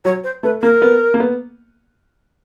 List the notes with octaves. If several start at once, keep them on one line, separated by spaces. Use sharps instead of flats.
F#3 C#5
C5
A3 B4
A#3 A#4
B3
A#3
B3